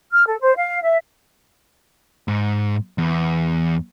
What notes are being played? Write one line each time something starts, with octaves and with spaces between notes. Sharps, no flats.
F6
A4
C5
F5
E5
G#2
E2